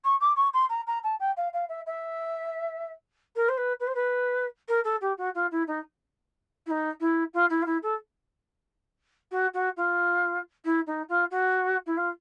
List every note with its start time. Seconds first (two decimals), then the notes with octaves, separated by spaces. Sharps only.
0.04 C#6
0.20 D6
0.36 C#6
0.54 C6
0.69 A#5
0.87 A#5
1.03 A5
1.20 G5
1.37 F5
1.53 F5
1.69 E5
1.86 E5
3.36 A#4
3.49 C5
3.57 B4
3.80 B4
3.87 C5
3.95 B4
4.68 A#4
4.84 A4
5.01 G4
5.18 F#4
5.35 F4
5.51 E4
5.67 D#4
6.66 E4
6.71 D#4
7.00 E4
7.34 F4
7.50 E4
7.62 F4
7.66 E4
7.83 A4
9.31 F#4
9.54 F#4
9.77 F4
10.65 E4
10.87 D#4
11.09 F4
11.31 F#4
11.86 E4
11.97 F4